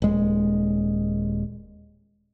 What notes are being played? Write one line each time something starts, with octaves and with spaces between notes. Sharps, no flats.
D#1 G#3